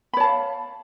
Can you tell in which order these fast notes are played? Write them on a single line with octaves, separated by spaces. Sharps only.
B5 C#5 A5 F5